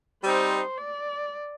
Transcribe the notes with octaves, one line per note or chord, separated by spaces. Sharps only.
G3 C4 D#4 C5
D5